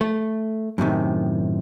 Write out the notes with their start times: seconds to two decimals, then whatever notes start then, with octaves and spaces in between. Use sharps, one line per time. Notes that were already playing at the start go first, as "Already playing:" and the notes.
0.01 A3
0.78 F#2 A2 C3 D#3